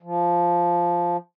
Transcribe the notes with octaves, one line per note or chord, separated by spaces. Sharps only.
F3